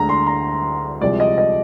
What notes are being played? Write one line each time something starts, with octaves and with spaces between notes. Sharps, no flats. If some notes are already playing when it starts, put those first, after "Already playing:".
Already playing: D2 D3 G#3 A#5
C6
A#5
C2 C3 F3 G#3 D5
D#5
D#5